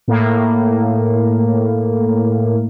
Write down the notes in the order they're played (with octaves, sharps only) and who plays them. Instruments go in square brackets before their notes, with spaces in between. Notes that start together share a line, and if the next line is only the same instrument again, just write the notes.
[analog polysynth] A2 A#3